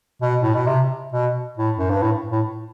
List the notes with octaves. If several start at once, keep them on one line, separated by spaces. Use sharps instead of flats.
B2
A2
B2
C3
B2
A2
F#2
G2
A2
A2